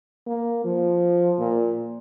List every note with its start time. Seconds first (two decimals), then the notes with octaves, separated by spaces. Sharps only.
0.27 A#3
0.64 F3
1.39 A#2